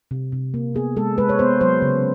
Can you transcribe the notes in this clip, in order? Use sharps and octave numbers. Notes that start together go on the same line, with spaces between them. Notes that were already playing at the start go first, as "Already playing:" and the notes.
C3
C3
A#3
B3 G#4
G#3 A4
G#3 B4
C#5
B3 C5
F#3 C5
C#3